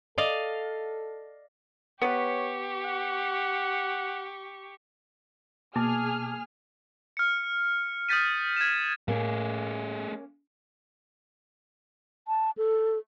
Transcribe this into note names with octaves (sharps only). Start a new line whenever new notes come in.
A4 D5 D#5 F5
B3 G4 B4 C#5 C#6
F#5
B2 A#3 G#4 A5 D6 F6
F6 C#7
D#6 F6 G6 A6 B6 D#7
G#6 E7
A2 A3 A#3 C#4 G#4
A5
A4